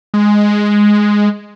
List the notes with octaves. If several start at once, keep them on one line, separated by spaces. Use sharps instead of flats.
G#3